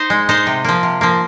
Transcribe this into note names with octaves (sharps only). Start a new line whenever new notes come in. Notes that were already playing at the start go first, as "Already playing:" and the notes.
Already playing: D#4 C5 D#5
G#3
D#4 C5 D#5
C3
F3 A#3
C3
F3 A#3